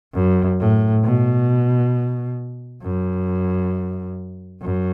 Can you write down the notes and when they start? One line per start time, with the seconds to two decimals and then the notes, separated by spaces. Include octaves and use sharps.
0.14 F#2
0.60 A2
1.04 B2
2.83 F#2
4.62 F#2